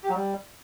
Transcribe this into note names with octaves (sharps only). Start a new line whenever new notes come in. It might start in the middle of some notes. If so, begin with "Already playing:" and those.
G4
F#3
G3